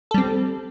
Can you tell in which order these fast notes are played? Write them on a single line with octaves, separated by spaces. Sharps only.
A4 G3 C4